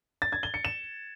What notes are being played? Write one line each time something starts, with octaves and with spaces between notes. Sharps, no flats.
A6
G#6
G7
C#7
E7